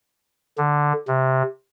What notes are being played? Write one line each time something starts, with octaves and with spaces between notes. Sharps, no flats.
D3
C3